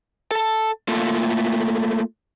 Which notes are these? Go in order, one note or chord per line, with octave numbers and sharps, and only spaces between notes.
A4 A5
A3 A#3 F4 A4